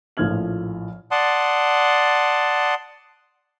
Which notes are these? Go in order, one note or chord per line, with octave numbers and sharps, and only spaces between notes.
A#1 A2 F3 F6 G#6 F#7
D5 F#5 A5 C6 D#6